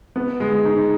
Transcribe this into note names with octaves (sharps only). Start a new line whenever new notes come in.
B3
G#3
D#4